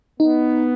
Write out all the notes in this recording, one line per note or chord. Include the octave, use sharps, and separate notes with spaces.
B3 D#4